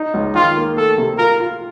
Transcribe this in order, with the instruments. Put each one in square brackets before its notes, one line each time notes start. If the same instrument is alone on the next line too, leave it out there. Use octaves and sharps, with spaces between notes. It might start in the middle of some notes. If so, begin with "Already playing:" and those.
Already playing: [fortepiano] D#4
C#2
[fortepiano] D#3 [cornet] F4
[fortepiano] A#3
[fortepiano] A3 [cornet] A4
[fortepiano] C3
[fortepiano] F4 [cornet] A#4
[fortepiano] F4